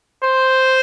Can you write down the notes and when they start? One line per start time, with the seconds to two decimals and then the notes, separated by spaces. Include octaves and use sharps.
0.24 C5